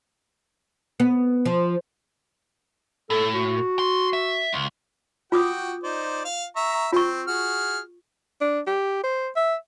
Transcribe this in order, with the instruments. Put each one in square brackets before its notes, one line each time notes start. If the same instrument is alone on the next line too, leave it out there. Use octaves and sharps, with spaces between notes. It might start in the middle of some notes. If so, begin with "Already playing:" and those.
[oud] B3
F3
[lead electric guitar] A2 [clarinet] A4
[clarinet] F#4
[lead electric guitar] C6
E5
C#2
[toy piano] F4 D6 D#6 [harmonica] F#4 G5
[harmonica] D#4 C5 D5
F5
E5 A#5 C#6
[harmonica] C4 [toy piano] F4 C#6
[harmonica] F#4 G#4 F6
[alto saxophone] D4
G4
C5
E5